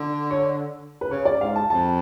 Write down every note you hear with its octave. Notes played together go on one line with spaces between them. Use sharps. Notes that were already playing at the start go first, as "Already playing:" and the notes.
Already playing: D3
C#5
B4
C#3 C#5
D5
G#2 F5
A5
F2 A5